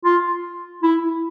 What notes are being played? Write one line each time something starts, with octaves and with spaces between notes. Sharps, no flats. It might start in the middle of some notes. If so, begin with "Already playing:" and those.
F4
E4